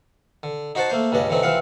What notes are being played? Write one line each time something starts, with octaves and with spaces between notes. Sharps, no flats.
D3
D#4 F#4 C5 F#5 A5
A3 A#3 C5
C#2 G2 C#3 D4 D#5
D3 E3 F#3 C4 D#4
C2 E3 F3 C4 F5 F#5